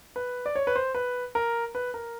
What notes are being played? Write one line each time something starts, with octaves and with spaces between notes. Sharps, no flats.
B4
D5
C#5
B4
C5
B4
A#4
B4
A#4